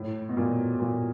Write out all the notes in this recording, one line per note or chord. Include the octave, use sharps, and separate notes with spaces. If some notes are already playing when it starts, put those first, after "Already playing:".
Already playing: A2
B2
A#2
A#2